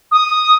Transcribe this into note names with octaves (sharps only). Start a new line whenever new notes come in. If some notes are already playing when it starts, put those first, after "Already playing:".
D#6